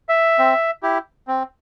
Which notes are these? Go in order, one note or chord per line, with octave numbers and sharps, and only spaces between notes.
E5
C4
E4 G4
C4